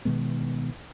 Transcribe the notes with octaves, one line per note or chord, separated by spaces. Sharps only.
B2 D#3 G#3 B3